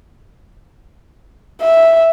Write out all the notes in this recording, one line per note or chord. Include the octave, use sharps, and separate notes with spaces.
E5